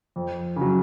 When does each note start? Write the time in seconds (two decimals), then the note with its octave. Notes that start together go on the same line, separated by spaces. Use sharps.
0.16 F2
0.56 C#3 F#3